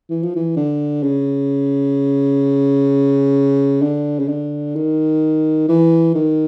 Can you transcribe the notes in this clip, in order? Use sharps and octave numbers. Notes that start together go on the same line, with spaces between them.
E3
F3
E3
D3
C#3
D3
C#3
D3
D#3
E3
D#3